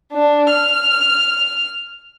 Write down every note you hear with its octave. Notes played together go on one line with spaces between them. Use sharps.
D4
F6